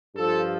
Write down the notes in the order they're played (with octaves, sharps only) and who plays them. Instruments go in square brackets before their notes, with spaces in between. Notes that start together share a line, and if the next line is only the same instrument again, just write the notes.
[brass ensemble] G2 F3 A4